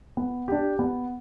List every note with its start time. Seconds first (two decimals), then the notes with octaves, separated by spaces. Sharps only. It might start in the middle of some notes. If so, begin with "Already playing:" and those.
0.17 B3
0.48 D4 G4
0.79 B3